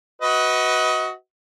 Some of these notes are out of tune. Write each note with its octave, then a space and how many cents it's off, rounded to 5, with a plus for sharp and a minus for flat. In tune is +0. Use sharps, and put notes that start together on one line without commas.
F#4 +0 B4 +5 D#5 +30